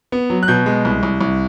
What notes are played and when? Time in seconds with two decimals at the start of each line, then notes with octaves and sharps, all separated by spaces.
0.12 B3
0.30 F#3
0.43 F#6
0.48 B2 G6
0.66 G#3
0.85 C2
1.03 C2
1.21 C2